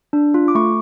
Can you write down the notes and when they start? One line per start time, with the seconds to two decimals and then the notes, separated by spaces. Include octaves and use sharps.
0.13 D4
0.34 F4
0.48 D6
0.55 A3 C#6